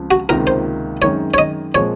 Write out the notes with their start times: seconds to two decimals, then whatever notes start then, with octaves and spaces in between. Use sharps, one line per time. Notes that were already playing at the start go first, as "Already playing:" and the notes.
Already playing: C#2 C#3 F3 C4
0.11 F#4
0.29 C#2 C3 D#3 A#3 F4 A#4
0.47 C5
1.02 F#2 D#3 G#3 C4 C#5
1.34 C#5
1.38 D#5
1.75 A#2 F3 G#3 C4 C#5